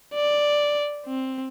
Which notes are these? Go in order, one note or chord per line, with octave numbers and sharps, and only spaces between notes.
D5
C4